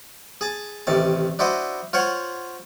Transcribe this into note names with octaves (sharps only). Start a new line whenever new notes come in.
G#4 A5
A1 C3 D#3 A5
D4 E4 F#4 C5 D#5
F4 C5 C#5 F#5